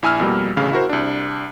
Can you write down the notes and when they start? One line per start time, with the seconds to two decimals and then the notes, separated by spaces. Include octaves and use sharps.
0.02 A#1 E4 G#5 E6 F6
0.20 F2 B2 G3 A#3
0.57 A1 D2 C#3 F5
0.72 E4 F#4 A#4 C5
0.89 C2 D4